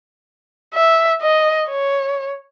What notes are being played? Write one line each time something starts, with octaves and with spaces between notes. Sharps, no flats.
E5
D#5
C#5